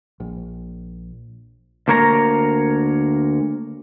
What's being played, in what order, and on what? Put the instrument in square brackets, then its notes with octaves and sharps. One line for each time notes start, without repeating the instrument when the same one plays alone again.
[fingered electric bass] A#1
[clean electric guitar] D2 A#3 A#4 C#5 A#5